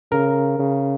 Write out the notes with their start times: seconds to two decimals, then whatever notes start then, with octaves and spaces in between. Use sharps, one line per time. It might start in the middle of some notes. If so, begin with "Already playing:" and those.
0.12 C#3 A#4
0.59 C#3